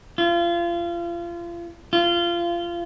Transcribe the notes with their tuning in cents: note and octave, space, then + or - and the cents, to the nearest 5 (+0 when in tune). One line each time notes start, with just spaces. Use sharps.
F4 -30
F4 -20